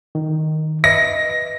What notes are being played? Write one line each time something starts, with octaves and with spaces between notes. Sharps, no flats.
D#3
B4 D#5 E5 A#6